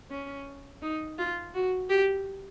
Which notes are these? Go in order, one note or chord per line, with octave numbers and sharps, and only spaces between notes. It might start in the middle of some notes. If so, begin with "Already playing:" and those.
C#4
D#4
F4
F#4
G4